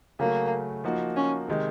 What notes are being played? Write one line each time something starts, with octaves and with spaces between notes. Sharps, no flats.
C#3 F#3 A3 A#3 C#4
F3 A#3 D#4 F#4
C#4
C3 D#3 G#3